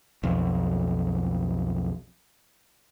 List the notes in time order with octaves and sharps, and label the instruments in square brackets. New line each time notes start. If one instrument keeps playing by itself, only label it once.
[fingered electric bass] B1 F2